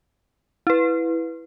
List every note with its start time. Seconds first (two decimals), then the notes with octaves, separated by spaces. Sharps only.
0.67 E4 B4